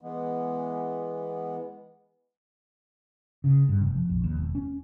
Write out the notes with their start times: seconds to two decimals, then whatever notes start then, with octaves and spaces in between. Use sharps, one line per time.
0.01 E3 G#3 B3
3.44 C#3
3.69 G2
3.81 F1
3.96 F2
4.10 A#1
4.24 D#2
4.37 E1
4.55 C#4